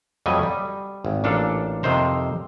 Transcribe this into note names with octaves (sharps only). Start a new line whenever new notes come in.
F2 F#3 G3 A3 D#5 G#5
G3
G#1
A1 A#2 D4 A4 F5
F2 C3 D#3 C5 A#5